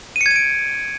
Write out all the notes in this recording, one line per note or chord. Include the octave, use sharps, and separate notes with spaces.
D#7
C#7
G#6
D#7
D7